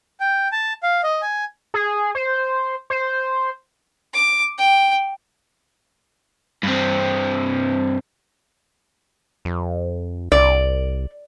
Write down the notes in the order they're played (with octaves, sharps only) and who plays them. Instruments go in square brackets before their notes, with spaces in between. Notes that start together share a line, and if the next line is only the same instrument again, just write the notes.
[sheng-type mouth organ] G5
A5
F5
D#5
G#5
[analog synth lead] G#4
C5
C5
[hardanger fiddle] D6
G5
[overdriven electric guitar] G2 C4
[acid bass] F2
[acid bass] C2 [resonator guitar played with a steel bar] D5